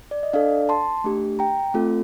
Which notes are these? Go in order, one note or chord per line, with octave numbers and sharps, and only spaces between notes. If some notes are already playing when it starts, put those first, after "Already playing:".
D5
D#5
D4 A4 D5 F5
A5 C6
A3 D4 G4
G5 A#5
A3 C4 F4 A4